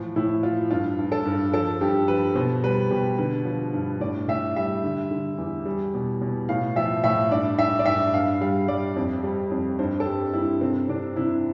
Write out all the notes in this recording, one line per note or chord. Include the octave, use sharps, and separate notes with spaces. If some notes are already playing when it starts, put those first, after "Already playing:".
Already playing: A2 E3 F3
A2 E4
F3 F4
G2 F4
G2
A4
G2
F3 A4
G2 G4
F3 B4
B2 C5
G3 B4
B2 G4
D3 B4
F3
G2
A2 D5
A2 E5
G3 E5
D3
D3
E2
G3
B2
B2
A2 F5
F3 E5
A2 E5
G2 D5
G2 E5
D5
G2 E5
G2 F5
G3 F5
G3 D5
F2
G3
F2
G2 C5
A4
G2 G4
G2 E4
C3 C4
C3 D4
C3 E4